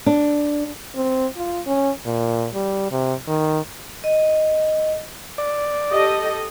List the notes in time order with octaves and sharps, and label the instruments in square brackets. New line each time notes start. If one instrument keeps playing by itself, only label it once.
[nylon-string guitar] D4
[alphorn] C4
F4
C#4
A#2
G3
C3
D#3
[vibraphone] D#5
[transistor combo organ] D5
[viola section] G4 A4 D#5